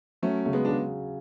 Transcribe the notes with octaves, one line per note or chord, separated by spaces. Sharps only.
F#3 A3 C#4
C#3 A3
G#3 B3
C#3 D4